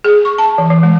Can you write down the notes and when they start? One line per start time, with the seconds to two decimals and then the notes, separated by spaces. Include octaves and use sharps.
0.04 G#4
0.25 C#6
0.38 A5
0.58 E3
0.70 E3
0.83 G#3